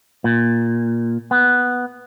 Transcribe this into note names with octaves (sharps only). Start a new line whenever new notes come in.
A#2
B3